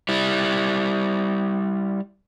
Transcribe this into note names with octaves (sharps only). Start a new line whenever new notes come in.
G3 E4